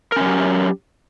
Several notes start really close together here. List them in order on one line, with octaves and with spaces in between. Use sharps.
A#4 C#4 F#3 G4